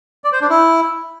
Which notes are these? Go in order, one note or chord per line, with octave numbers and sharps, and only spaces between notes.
D5
C5
D4
E4